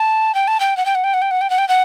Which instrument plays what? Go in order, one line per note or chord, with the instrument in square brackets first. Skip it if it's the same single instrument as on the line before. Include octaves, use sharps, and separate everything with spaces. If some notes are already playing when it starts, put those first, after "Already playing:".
Already playing: [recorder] A5
G5
A5
G5
F#5
G5
F#5
G5
F#5
G5
F#5
G5
F#5
G5
F#5